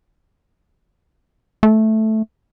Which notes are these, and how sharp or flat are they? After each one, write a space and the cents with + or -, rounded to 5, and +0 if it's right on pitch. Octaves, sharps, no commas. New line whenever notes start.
A3 -5